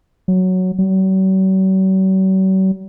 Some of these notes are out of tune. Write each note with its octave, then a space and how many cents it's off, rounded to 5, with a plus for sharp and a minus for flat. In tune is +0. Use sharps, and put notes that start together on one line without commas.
F#3 +0
F#3 +45